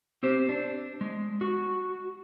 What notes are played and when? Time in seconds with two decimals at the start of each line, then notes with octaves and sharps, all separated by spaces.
0.23 C4 G4 C5
0.49 D4
1.01 G#3
1.41 F#4